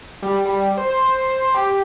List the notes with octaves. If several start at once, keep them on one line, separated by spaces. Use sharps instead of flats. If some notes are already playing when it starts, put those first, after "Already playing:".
G3
G3
C5
G4